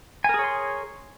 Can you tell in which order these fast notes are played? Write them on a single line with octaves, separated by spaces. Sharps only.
G#5 A#4 G#4 C#5 C6